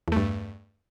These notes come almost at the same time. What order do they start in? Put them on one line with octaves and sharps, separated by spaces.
E2 A3 G2